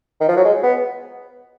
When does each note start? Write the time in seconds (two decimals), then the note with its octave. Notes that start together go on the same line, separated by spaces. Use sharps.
0.21 D#3
0.28 F3
0.37 F#3
0.45 G#3
0.63 B3